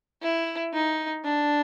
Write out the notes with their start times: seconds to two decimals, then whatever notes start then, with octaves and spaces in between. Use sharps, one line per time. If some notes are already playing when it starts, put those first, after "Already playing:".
0.22 E4
0.73 D#4
1.24 D4